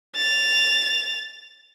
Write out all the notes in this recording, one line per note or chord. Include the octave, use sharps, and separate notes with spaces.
A6 F7